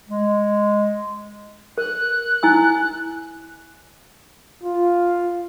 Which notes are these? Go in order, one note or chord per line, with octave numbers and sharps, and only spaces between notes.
G#3
A#4 F#6
E4 G#5 E6
F4